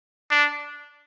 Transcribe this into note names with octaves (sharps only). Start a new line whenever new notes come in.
D4